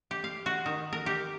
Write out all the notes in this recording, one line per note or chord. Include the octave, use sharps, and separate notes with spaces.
G4
F5
F#4
D#3
A#4
G4